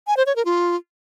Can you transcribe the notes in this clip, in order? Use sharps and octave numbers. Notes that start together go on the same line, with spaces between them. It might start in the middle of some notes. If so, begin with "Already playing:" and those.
G#5
C5
C#5
A#4
F4